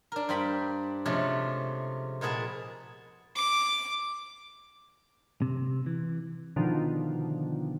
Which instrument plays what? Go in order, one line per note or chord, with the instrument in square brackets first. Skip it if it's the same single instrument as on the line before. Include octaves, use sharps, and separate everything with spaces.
[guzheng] D4 A#4
G2 C5 G5 B5
C3 F3 G#3 A3 C#4
A#2 G#3 B3 G#4 A5
[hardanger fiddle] D6
[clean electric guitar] C3
E3
[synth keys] B2 D3 D#3 F3